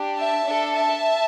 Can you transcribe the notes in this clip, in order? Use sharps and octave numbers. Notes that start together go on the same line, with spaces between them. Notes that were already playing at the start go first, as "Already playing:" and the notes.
Already playing: D4 G4
E5 A5
D4 A4
E5 A5